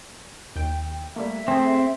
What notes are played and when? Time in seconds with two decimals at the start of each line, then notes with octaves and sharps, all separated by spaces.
0.56 D#2 G5
1.16 G3 A3 A#3 E5
1.48 A3 C4 G#4